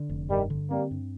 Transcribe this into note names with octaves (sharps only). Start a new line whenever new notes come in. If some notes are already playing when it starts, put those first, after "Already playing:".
Already playing: D3
F1
G2 D#3 G3
D3
G3 A#3 C4
G2